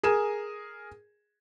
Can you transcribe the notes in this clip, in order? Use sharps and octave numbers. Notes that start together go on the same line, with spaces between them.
G#4 A#4 G#5 E7